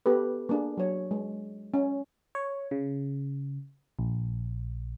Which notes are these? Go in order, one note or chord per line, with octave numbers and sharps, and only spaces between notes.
B3 G4 A4 B4
A#3 D4 G#4
F#3 C#5
G#3
C#4
C#5
C#3
A#1